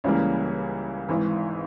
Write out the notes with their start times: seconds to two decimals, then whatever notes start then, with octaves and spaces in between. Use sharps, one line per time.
0.04 C#2 C#3 E3 G3 A#3
1.09 G#1 G#2 E3